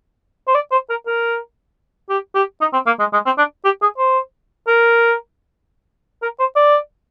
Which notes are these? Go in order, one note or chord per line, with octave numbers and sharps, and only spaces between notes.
C5
D5
C5
A#4
A#4
G4
G4
D#4
C4
A#3
G#3
G#3
C4
D4
G4
G#4
C5
A#4
A#4
C5
D5